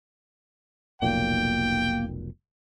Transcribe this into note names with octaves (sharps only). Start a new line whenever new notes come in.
F1 B1 A#2 A#3 G5